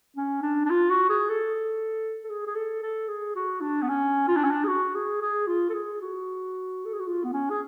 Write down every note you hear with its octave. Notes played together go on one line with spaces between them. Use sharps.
C#4
D4
D4
F4
F#4
G#4
A4
A4
G#4
G#4
A4
A4
G#4
F#4
D4
B3
C#4
F4
D4
C#4
D4
G#4
F#4
G#4
G#4
F4
A4
G#4
F#4
A4
G#4
F#4
F4
B3
C#4
G#4